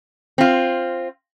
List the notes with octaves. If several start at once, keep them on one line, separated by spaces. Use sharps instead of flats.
C4 F4